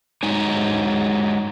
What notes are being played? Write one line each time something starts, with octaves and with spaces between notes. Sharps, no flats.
F#3 G#3 D#4 G#5